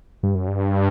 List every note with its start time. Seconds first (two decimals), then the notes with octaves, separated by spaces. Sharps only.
0.23 G2
0.35 F#2
0.48 G2